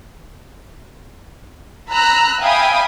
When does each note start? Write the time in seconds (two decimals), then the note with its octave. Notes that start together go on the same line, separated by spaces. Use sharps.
1.90 A#5 B5 E6 F#6
2.40 E5 F5 G5 G#5 B5 D#6